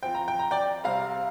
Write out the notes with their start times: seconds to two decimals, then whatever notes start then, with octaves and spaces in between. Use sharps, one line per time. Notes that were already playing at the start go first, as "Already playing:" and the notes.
0.03 F3 C4 G5
0.15 A#5
0.28 G5
0.39 A#5
0.51 D5 G5
0.84 C3 G3 C4 F5 A#5